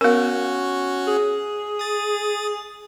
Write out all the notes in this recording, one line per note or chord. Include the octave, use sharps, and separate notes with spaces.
B3 C#4 F#4 A#4
G#4
D#6 A6